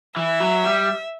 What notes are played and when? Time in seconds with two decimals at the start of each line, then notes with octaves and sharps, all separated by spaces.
0.16 E3 E5
0.40 F#3
0.64 G3